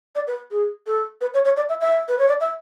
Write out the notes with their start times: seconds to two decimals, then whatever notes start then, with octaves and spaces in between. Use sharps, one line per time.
0.15 D5
0.27 B4
0.51 G#4
0.87 A4
1.21 B4
1.34 C#5
1.45 C#5
1.57 D5
1.69 E5
1.81 E5
2.09 B4
2.19 C#5
2.28 D5
2.40 E5